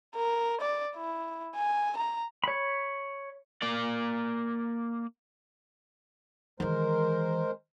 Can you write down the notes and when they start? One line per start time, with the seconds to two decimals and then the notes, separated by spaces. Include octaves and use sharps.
0.15 A#4
0.61 D5
0.96 E4
1.56 G#5
1.97 A#5
2.44 C#5 B5
3.62 A#3 D5
6.60 D#3 E3 G#3 A#4 C5